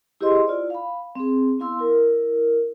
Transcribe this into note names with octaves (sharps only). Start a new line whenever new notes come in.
E4 G4 G#4 C5 D#5 C6
E4 F4 D5
F5 B5
C4 G#4
B3 E4 F5 C6 E6
E4 A#4